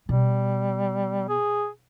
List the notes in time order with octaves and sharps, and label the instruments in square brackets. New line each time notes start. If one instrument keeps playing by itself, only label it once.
[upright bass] B2 [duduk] G3
[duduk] G#4